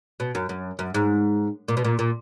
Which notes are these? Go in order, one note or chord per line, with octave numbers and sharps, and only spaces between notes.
B2
F#2
F#2
F#2
G#2
A#2
B2
A#2
A#2